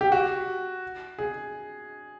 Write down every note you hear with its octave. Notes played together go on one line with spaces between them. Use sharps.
G4
F#4
G#4